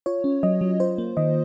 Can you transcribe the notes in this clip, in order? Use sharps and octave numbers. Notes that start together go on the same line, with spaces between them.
F4 C#5
C#4
F#3 D#5
F#3
F4 C5
A#3
D#3 D#5